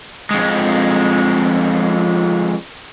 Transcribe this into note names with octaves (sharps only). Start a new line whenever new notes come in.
F2 G#3